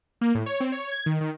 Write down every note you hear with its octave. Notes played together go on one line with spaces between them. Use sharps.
A#3
A2
C#5
C4
C#5
G#6
D#3
D#3